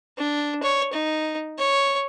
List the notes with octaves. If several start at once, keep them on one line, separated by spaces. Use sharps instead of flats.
D4
C#5
D#4
C#5